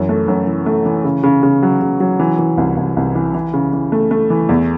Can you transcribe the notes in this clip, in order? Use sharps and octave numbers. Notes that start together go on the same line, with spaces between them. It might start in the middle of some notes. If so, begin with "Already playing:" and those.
Already playing: F#2 E3
A3
F#2
E3
A3
E3
C#3
C#3
C#3
F#3
C#3
F#3
E3
E3
C2
C2
C2
E3
E3
C#3
E3
A3
A3
E3
E2